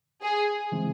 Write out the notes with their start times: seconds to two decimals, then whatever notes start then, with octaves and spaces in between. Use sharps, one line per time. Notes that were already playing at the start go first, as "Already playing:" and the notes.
0.22 G#4
0.72 C#3 E3 G#3 C4 E4